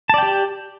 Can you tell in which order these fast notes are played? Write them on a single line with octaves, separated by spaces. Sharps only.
A5 D5 G5 G4